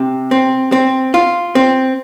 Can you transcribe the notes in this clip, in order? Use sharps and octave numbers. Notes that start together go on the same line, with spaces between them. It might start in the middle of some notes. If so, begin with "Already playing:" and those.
Already playing: C3
C4
C4
F4
C4